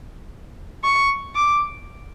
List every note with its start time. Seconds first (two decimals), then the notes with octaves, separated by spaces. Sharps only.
0.84 C#6
1.35 D6